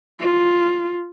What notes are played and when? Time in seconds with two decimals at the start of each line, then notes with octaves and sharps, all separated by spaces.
0.20 F4